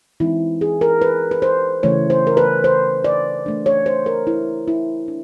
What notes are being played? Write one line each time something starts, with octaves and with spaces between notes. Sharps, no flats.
E3 G#3 C4 D#4 E4
G#4
A#4
B4
B4
C5
C#3 E3 A3 C#5
C5
A#4
B4
C5
D5
E3 A3 D4
C#5
C5
A#4
E4
E4
D4